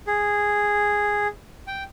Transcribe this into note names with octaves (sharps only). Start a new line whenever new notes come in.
G#4
G5